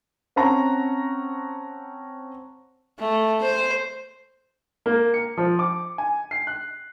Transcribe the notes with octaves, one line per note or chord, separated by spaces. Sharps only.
C4 C#4 F#5 A5 A#5
A3
C5
A#3
C#7
F3
D6
G#5
C7
F#6